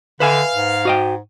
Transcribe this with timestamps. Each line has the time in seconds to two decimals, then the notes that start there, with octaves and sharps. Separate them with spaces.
0.20 D3 B4 E5 F5 G#5
0.55 G#2
0.85 F#4 D#5 G5